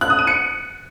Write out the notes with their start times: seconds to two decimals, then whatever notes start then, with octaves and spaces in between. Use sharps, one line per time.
0.01 F#6
0.10 D#6
0.19 D#7
0.27 C#7